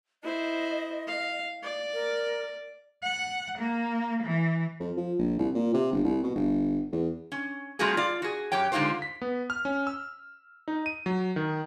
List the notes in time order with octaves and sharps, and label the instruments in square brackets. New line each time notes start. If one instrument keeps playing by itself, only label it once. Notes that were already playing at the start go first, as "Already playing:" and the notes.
[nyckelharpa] E4 C5 [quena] D#5
[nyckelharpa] F5
D5
[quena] A#4
[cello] F#5
A#3
E3
[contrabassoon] F2
F3
A#1
C2
A#2
C3
G1
C2
B2
G1
E2
[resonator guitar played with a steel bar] C#4
G3 A3 C4 F4 F#4 G#4
F4 D5
F#4 G#4
F#2 G4 C#5 G5
D3 G#3 D#4 F4 G4 C5
[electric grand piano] B6
B3
F6
C#4
E6
D#4
D#7
F#3
D#3